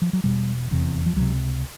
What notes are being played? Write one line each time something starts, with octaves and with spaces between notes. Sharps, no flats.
F3
F#3
E1 E2 B2 G3
F1 E2 C3
F3
C#2 C3 F#3